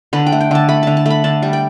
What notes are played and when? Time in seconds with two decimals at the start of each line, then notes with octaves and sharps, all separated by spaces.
0.13 D3 B4
0.26 G5
0.32 A3
0.41 G5
0.51 D3 A5
0.69 A3 B5
0.83 D3 A5
0.97 A5
1.06 A3 B5
1.24 D3 A5
1.42 G3
1.53 G5